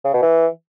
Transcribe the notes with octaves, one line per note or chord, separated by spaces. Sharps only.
C#3
B2
E3